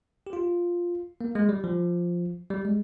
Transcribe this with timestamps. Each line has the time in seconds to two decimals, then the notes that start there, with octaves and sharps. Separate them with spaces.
0.27 G4
0.33 F4
1.21 A#3
1.35 G#3
1.49 G3
1.64 F3
2.50 G3
2.65 G#3